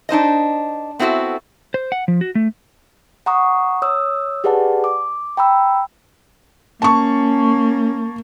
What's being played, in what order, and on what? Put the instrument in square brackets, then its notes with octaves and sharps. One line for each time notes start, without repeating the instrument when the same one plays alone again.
[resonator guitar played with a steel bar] D4 D#4 C5 D#5
B3 C4 E4 F#4 A4
[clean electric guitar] C5
F#5
F3
F#4
A3
[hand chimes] F#5 A#5 C#6 D#6
C#5 D#6 E6
G4 G#4 B4 D5 F#5 A5
D6
G5 A#5 B5 E6
[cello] A#3 [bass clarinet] C#4 [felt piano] A5 C#6